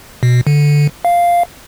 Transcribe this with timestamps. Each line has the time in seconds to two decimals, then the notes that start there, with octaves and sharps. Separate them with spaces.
0.23 B2
0.47 D3
1.05 F5